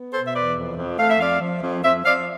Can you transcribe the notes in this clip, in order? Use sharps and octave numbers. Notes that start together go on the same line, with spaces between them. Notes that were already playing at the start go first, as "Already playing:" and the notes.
Already playing: B3
B2 A4 C5
E5
E2 B4 D5
F2
F2
A3 F5
E5
F2 D5 F5
F3
F2
F2 C5 E5
F3 D5 F5